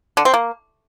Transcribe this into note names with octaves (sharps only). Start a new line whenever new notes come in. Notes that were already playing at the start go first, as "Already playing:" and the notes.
D3
C4
A#3